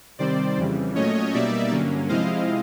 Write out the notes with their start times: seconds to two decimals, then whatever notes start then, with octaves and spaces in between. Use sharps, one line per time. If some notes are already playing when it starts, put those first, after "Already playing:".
0.19 C3 D#3 G3 C4 C5 D5
0.57 F2 C#3 E3 G3
0.95 A#2 F#3 A3 C#4 C#5 D#5
1.34 B2 G3 A#3 D#4 D5 E5
1.71 G2 D3 F#3 A#3 C#4
2.09 C3 F3 G#3 C4 E4 D#5 F5